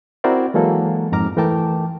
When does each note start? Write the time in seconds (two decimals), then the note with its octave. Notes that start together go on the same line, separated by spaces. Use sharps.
0.24 C4 E4 F#4 A#4 C5 D5
0.54 E3 F#3 G#3 A#3 A4
1.12 F2 G#2 A#5 D6 F6
1.37 E3 A3 A#4 G5 A5 D6